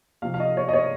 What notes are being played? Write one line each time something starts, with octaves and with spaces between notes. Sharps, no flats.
C3 F3 C4 F5
F5
D#5
C#5
D#5
C#5